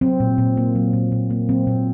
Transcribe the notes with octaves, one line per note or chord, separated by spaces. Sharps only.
F#3 C4
A#2
A#2
A#3
F#3
A#2
A#2
A#3
F#3 C4
A#2